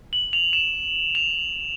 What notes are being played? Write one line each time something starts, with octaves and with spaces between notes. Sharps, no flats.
F#7
F7
E7
F7